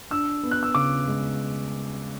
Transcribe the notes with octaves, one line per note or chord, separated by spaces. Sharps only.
D4 E6
B3
F#6
E6
C#3 D6
G#3